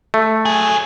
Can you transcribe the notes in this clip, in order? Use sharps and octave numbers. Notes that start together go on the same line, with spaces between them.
A3
F#3 G#4